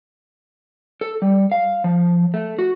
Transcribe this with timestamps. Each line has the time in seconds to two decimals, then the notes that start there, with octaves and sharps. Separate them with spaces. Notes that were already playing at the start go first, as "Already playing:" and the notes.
1.01 A4
1.22 G3
1.52 F5
1.84 F3
2.34 A3
2.59 F#4